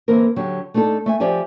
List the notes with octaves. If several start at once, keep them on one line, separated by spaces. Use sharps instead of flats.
D3 E3 A#3 C4 A#4
D3 F#3 G4
A3 D4 D#4 G4 A4
A3 E5 G#5
F3 G4 D5 E5 G#5